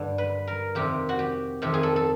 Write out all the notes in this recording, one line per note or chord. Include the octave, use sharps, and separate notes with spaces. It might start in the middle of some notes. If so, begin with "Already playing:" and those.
Already playing: G2 D3
B4
A#4
F2 C3 D#3 G4
F#4
G4
F2 C3 D#3 G4
G#4
A4
A4